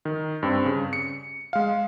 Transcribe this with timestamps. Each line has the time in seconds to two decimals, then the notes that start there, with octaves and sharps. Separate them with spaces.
0.05 D#3
0.43 G2 C4
0.66 C#3
0.93 C#7
1.53 G#3 F5